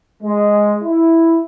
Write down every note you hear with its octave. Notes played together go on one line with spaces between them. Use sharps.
G#3
E4